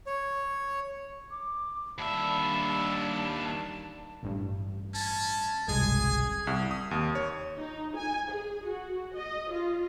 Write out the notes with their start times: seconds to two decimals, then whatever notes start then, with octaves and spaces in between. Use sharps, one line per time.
0.06 C#5
1.31 D6
1.98 D#2 D#3 G3 D4 E5 A5 B5
4.23 A1 G2
4.94 C#4 A5
5.68 G1 C2 B2 G#3 G#4 G#5
6.47 C2
6.71 D#6
6.91 D#2
7.15 C#5
7.59 D#4
7.98 G#5
8.32 G#4
8.67 F#4
9.17 D#5
9.52 F4